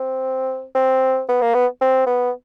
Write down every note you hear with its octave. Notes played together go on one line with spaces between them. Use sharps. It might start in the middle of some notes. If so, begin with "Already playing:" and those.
Already playing: C4
C4
B3
A#3
B3
C4
B3